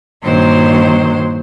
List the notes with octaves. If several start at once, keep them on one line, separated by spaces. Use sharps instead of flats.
G2 A#2 D#3 F#3 C5 C6